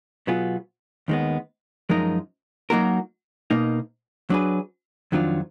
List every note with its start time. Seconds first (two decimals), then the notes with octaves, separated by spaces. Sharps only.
0.27 B2 F#3 B3 F4 G#4
1.08 D#2 D#3 G#3 B3
1.90 F#2 F3 G#3 D#4 A#4
2.70 F#3 A#3 D#4 F#4 A#4
3.51 B2 A#3 D#4
4.30 F#3 D4 G#4 B4
5.12 F2 D#3 F#3 D4 F4